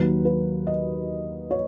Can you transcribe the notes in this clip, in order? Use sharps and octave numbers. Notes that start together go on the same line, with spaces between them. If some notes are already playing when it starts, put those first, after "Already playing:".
Already playing: D#2 D#3 F#3 B4
B4
D#5
C#5